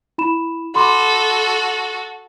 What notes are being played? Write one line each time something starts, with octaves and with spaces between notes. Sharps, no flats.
E4 B5 E7
F#4 A4 B5 C6 D6